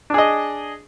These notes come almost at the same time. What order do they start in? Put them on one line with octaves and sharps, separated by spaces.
D4 G#4 D#5